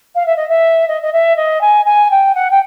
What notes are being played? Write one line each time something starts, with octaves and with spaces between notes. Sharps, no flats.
F5
E5
D#5
E5
D#5
D#5
E5
D#5
G#5
G#5
G5
F#5
G5